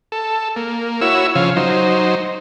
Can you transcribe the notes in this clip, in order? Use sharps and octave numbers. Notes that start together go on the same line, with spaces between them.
A4
A#3
E4 F#4 C#5 E6
C#3 F3 C#5 F5
F#3 D#4 C5